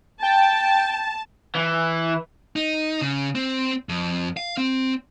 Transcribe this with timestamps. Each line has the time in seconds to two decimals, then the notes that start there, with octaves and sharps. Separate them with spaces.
0.22 G5 A5
1.55 E3
2.56 D#4
3.01 C#3
3.35 C4
3.89 F2
4.37 F5
4.57 C4